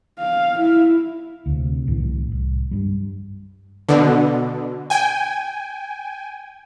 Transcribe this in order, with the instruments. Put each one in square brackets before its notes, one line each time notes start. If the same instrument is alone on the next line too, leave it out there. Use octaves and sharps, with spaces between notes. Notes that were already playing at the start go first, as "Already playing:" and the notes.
[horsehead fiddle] F5
E4
[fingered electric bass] D2 C3
C2 A2 E3
C2
G2 G3
[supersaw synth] B2 D3
G5 G#5